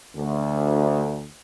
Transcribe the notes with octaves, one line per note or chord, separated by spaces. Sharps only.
D2